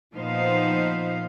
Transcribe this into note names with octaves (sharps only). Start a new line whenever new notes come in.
A#2 F3 B3 D#4 C5 F5